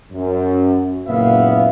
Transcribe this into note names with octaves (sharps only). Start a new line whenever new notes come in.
F#2
F#1 A#2 B3 E5 F5